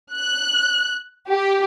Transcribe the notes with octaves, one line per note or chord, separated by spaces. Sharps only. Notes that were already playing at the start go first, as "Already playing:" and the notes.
F#6
G4